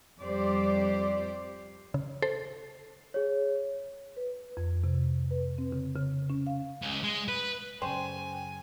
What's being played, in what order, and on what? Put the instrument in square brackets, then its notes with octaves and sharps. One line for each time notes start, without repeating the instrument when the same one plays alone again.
[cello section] F2 G3 G4 C5 D5
[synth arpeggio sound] C#3
A4 C5
[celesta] G#4 C#5
[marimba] B4
F2
C3
B4
C4
C#3
C#3
C#4
F5
[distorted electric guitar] C#2
G#3
B4
[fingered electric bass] F#2 C#3 [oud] C5 [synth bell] G5 [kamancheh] G#5